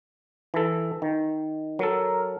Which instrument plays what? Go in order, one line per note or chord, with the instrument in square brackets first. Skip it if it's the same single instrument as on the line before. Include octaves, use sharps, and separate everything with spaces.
[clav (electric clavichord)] E3 A4
D#3
[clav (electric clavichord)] F#3 A4 [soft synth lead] A#4